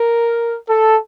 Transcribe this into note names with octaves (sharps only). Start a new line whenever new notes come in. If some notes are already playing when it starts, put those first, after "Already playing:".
Already playing: A#4
A4